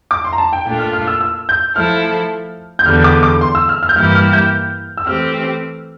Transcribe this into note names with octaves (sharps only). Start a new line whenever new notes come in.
D6
C6
A#5
A5
G5
A#2 A3 D4 F4 A4 G5
F6
F6
E6
E6
G6
F3 A3 E4 A4 F6
G6
E2 D3 G3 F6
D6
D6
C6
E6
F6
F6
G6
G2 E3 A#3 E4 G4 F6
F6
G6
E6
E3 A3 C4 G4 F6